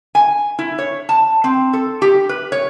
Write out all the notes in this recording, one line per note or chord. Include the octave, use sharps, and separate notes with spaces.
G#5
E4
C#5
A5
C4
A4
G4
B4
C#5